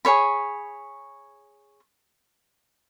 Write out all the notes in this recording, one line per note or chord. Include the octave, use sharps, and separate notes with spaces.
G#4 C5 C#5 B5